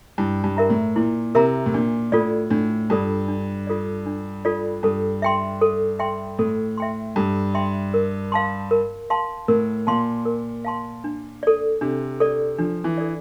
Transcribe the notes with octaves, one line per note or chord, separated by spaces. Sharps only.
G2 E4
G2
A#4 E5 A#5
A2
A#2 E4
C3 A#4 E5 A#5
A2
A#2 D4
A2 F4 A4 D5
A2 D4
G2 F4 A4 D5
D4
F4 A4 D5
D4
F4 A4 D5
G2 A4
E5 G5 C6
A4
E5 G5 C6
A2 A4
E5 G5 C6
G2 A4
E5 G5 C6
A#4
F5 A5 C6
A#4
F5 A5 C6
A2 A#4
A#2 F5 A5 C6
A#4
F5 A5 C6
D4
A4 D5
C3 D4
A4 D5
F3 D4
E3
A4 D5